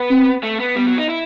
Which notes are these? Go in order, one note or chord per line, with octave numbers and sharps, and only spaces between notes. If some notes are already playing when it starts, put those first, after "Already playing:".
Already playing: B3
C4
A3
B3
G3 B3
F#3
D#4
E4